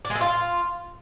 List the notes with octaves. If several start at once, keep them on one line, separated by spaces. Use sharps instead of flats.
D4
G#3
A4
F4